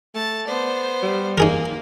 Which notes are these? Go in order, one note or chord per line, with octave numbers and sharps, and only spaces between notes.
A3 A5
B3 C5 D5
G3
A#3 D#4 G#4 A#4